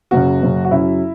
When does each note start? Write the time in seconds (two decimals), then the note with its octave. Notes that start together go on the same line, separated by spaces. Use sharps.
0.11 F#1 F#2 C#3 F#4
0.42 F#1 F#2 C#3
0.65 F#4
0.71 F#2 C#3 F#3 C#4 E4